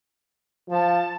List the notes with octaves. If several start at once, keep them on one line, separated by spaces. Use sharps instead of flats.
F3 A5